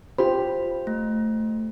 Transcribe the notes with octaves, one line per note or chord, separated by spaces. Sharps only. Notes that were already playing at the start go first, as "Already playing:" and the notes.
F4 G4 C5 B5
A3